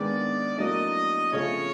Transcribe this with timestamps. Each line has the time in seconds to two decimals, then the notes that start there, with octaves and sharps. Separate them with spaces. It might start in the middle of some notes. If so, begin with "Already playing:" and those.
Already playing: G#2 D#3 G#3 B3 D4 D5
0.58 A2 F#3 A#3 D4 D#5
1.33 C#3 F3 A3 C#5